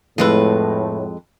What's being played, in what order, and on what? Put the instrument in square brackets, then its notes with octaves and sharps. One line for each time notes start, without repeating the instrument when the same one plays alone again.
[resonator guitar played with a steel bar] F2 G#3 B4 [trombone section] A2